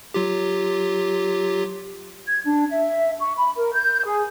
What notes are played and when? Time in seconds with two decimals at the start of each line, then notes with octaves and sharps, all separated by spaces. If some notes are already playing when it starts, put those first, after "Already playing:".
0.14 F#3 F4 G4
2.28 G#6
2.44 D4
2.70 E5
3.20 C#6
3.37 B5
3.56 A#4
3.74 G6
4.05 G#4